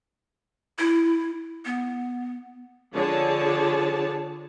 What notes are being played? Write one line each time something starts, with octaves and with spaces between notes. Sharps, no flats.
E4
B3
D3 F3 G#4 C#5 A5